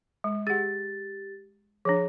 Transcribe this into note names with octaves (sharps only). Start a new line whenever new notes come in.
G#3
G4 G#4 F#5 A6
F3 D4 G#4 C#5